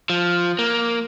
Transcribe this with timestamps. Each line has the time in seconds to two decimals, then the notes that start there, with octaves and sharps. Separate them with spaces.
0.10 F3
0.59 A#3